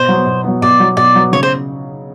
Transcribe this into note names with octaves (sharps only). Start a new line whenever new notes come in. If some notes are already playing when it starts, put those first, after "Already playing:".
Already playing: B2 C5
F#3 B3
B2
F#3 B3
B2 D5
F#3 B3
B2 D5
F#3 B3
C#3 C#5
C5